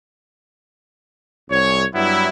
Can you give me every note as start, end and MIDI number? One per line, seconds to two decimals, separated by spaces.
1.50 1.84 36
1.50 1.84 73
1.94 2.29 43
1.94 2.29 54
1.94 2.29 55
1.94 2.29 59
1.94 2.29 64